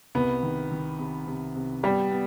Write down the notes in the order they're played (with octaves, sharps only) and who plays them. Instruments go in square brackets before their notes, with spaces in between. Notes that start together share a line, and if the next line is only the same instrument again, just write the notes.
[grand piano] C2 [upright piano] B3
[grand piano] D#3
D#3
C3
C3
C3
[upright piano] G3 [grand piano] B3
[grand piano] B3